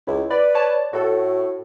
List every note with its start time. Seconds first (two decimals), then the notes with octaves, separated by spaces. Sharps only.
0.07 C#2 E4
0.31 B4 D5
0.55 C#5 D5 A5
0.93 A2 F#4 A4